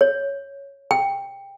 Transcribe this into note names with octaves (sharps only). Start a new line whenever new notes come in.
C#5
G5